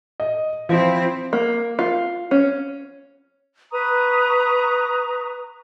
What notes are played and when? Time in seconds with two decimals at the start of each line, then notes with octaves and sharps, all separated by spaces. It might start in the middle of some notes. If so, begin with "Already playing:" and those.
0.20 D#5
0.69 F3 C4 E4
1.33 A#3
1.79 F4
2.31 C#4
3.71 B4 A#5 C#6 D#6